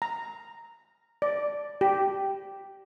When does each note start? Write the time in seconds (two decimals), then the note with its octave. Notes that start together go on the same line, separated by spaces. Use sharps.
0.02 A#5
1.22 D5
1.81 G4